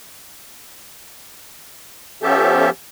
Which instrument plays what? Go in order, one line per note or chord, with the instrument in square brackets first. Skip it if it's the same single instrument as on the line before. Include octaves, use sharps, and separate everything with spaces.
[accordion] F3 B3 C#4 G4 A4 E5